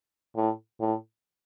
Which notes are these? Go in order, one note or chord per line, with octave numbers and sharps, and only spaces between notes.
A2
A2